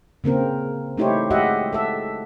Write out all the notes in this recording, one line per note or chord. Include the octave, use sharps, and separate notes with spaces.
C#3 A#3 C4 A#4
A3 D#4 E4 G4 C5 C#5
G#3 F#4 G4 D#5 E5 F#5
A4 E5